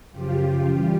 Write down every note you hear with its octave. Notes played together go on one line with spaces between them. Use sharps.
F#2 C#3 F3 F4 G4
F4 G4
E3 G3